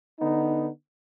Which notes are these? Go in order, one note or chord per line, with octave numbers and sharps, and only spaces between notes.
D3 B3 D#4